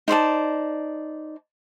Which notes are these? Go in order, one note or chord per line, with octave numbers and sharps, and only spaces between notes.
D#4 C5 D5 A5